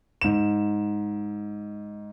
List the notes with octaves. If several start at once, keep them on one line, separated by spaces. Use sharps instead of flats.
G#2 E7